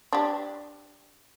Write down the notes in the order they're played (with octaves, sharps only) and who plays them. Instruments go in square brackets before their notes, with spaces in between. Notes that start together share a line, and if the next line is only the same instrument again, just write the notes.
[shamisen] D4 G4